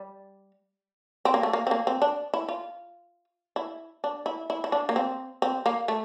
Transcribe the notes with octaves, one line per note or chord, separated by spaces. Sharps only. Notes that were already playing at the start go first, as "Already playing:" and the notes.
Already playing: G3
C4
A#3
A3
A#3
C4
A#3
C4
D4
E4
F4
E4
D4
E4
E4
E4
D4
A#3
C4
C4
A#3
A3